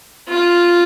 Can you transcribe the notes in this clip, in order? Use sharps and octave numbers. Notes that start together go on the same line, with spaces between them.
F4